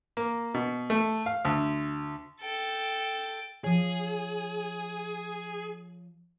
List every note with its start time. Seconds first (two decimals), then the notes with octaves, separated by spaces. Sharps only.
0.17 A#3
0.54 B2
0.90 A3
1.26 F5
1.45 D2
2.41 A4 G5
3.64 F3 G#4 C#5